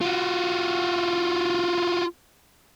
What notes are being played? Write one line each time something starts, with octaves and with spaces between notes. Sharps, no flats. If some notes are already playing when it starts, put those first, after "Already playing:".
F4 F#4